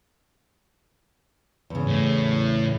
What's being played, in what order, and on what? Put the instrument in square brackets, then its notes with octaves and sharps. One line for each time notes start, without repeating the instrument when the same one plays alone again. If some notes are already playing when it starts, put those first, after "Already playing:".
[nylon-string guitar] E2 C#3
[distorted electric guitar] A2